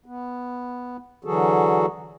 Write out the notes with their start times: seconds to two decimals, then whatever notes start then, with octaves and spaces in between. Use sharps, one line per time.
0.06 B3
1.24 D3 E3 F#3 F#4 G#4 A4